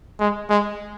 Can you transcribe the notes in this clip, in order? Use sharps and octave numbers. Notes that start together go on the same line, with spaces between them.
G#3
G#3